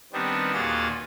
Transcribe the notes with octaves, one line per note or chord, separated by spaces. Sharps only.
D#3 G3 B3 C4 D4
D#2 A#2 F4 F#4 G#4 A6